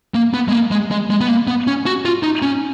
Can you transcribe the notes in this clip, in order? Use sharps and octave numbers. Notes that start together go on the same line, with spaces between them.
A#3
B3
G#3
A#3
G#3
G#3
G#3
B3
A#3
B3
C#4
F#4
F4
D#4
C#4